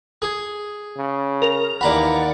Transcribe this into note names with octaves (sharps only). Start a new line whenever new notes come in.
G#4
C#3
A#4 F7
D#2 E3 D5 F#5 A#5 B5